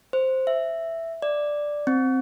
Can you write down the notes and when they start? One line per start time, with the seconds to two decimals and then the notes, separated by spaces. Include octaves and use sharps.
0.13 C5
0.47 E5
1.22 D5
1.87 C4